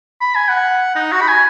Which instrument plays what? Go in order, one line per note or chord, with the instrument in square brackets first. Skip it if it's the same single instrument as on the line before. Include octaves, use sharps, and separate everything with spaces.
[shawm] B5
G#5
F#5
D#4
F#4
B5
G#5